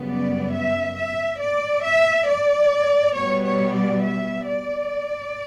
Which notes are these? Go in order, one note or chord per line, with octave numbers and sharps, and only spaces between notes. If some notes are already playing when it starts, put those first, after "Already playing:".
Already playing: F#2 C#3 G3 B3
D5
E5
E5
D5
E5
D5
B2 G3 B3 C#5
C#5
D5
E5
D5